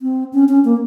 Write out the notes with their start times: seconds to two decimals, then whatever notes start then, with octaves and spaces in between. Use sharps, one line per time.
0.02 C4
0.33 C#4
0.49 C#4
0.65 A#3